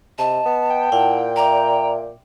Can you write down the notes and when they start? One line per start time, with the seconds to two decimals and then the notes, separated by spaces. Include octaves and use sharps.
0.18 C3 D#5 A5
0.46 B3
0.70 G5
0.92 A#2 E4 F5 F#5
1.36 D5 E5 A#5 D6